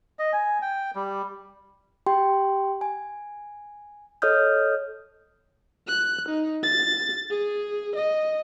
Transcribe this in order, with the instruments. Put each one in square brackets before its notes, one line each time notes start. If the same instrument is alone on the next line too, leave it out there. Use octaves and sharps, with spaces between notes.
[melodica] D#5
G#5
G5
G3
[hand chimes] G4 G5 C6
G#5
A4 C#5 D#5 D#6 F6 G6
[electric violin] F#6
D#4
A6
G#4
D#5